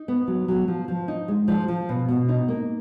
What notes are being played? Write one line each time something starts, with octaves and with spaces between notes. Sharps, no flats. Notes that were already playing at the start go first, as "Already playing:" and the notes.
Already playing: D#4
B3
F#3
F#3
F3
F3
D#4
G#3
F3
F3
B2
B2
D#4
A#3